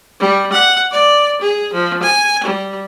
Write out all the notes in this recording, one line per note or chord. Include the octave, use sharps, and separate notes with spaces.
G3
F#5
D5
G#4
F3
G#5
G3